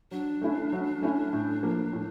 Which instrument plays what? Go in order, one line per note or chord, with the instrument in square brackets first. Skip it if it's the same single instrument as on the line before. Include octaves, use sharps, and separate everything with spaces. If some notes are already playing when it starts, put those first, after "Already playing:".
[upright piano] F#3 [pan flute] D4
[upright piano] A3 C#4 E4
F#3
A3 C#4 E4
A2
F3 A#3
A2